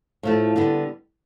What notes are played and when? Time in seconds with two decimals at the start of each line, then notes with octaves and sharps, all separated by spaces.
0.23 A2 F3 A3
0.56 D3 G3 B3